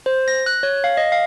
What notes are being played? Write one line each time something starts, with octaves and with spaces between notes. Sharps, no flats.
C5
A#6
F#6
C#5
F5
D#5
F5